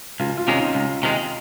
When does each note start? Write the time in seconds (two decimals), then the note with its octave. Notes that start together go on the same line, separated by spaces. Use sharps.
0.19 C#2 F4
0.37 F4
0.48 C3 D#3 G#3 C#4
0.57 D#4
0.75 C#2
1.03 C3 D#3 G#3